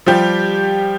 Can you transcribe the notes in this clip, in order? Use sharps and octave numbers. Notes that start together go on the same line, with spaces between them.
F3 G3 G4